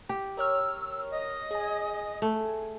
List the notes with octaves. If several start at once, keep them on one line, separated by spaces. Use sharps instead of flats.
G4 G5
A#4 C#5 E6 F6
D#5
G#4 G#5
A3